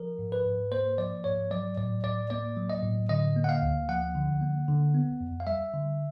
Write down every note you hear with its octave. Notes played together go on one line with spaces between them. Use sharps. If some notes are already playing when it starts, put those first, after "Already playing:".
Already playing: F3 A#4
G#2
B4
G#2
A#3 C5
F3 D5
G#2 C#5
F#3 D5
A2 D5
A2 D5
A#3 D5
F#3
D#5
A2
D3 D#5
A#3
F#5
F5
D2
F3 F#5
D3
A#3
D3
B3
F2
F5
G3 E5
D3